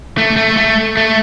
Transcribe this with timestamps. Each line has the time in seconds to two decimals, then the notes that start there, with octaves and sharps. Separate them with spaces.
0.18 A3
0.37 A3
0.57 A3
0.97 A3